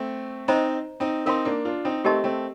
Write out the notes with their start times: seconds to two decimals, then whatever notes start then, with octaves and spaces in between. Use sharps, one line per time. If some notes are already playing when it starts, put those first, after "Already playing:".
Already playing: A3 C4
0.48 C4 D#4 C5 D#5 A#5
1.00 C4 D#4
1.26 C4 D#4 A#4 F5 A5 C6
1.45 A#3 D4
1.65 D4 F4
1.85 C4 D#4
2.04 A3 C4 G4 A#4 D#5 A5 C6
2.24 A3 C4